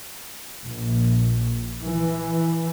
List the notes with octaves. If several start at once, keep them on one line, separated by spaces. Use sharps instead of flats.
A#1
E3